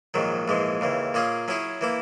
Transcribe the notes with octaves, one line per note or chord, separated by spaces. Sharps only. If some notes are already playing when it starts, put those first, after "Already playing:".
A#1 G#2 D#3 F#3
A#1 G#2 E3 G#3
D#2 C#3 E3
A#2 A#3 C#4 G#4
F#3 C#4 E4 G#4
E3 A#3 E4